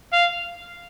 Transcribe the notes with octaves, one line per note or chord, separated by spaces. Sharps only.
F5